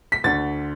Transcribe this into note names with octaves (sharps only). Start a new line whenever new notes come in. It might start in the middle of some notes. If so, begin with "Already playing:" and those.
B6
D2 D3 A6